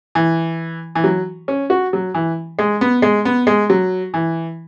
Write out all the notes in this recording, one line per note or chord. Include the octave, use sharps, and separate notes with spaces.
E3
E3
F#3
C#4
F#4
F#3
E3
G#3
B3
G#3
B3
G#3
F#3
E3